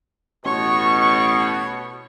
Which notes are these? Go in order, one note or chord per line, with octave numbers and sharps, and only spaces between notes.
A1 B2 C#5 C#6